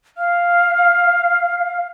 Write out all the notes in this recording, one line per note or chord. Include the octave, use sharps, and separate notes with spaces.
F5 F6